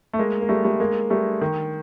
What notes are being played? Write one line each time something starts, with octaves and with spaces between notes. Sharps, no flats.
A3
G#3 A#3
A#3
G3 A3
G3 A3
G#3 A#3
G3 A3
D#3